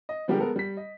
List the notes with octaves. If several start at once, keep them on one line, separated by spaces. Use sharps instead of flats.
D#5
D3 F3 G3 G#3 G4 A#4
G#3 B3 A4 A#4
G3 B6
D#5